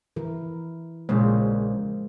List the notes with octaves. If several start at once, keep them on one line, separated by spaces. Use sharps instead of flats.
E3 E4 A#4
A#1 C#3 G#3 A#3 C5